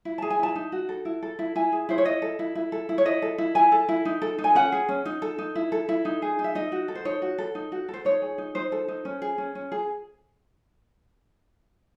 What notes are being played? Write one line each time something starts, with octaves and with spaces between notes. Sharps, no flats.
E4
G#4 A5
G#5
E4 A5
D#4
F#4
A4
E4
A4
E4
E4 G#5
G#4
E4 C5
C#5
E4 D#5
A4
E4
E4
A4
E4
C#5
E4 D#5
A4
E4
E4 G#5
A4
E4
D#4
A4
D#4
G#5
C#4 F#5
G#4
C#4
D#4
A4
D#4
E4
A4
E4
D#4
G#4
D#4
E5
D#4 D#5
F#4
A4
C5
D#4 C#5
F#4
A4
D#4
F#4
A4
C5
D#4 C#5
G#4
D#4
D#4 C5
A4
D#4
C#4
G#4
C#4
C#4
G#4